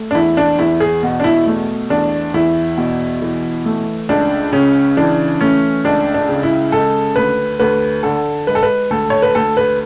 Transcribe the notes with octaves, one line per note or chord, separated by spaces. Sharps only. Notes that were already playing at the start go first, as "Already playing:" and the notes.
Already playing: A3
D4
E2 E4
D4
E2 E4
G#4
B2 F#4
D4
E4
A3
E2 D4
E2 E4
B2
E3
A3
C#2 D4
C#3 C#4
E3 D4
A3 C#4
C#2 D4
D4
C#3
E4
G#3 A4
D2 B4
D2 B4
D3 A4
G#3 B4
A4
B4
D2 A4
C#5
B4
D2 A4
B4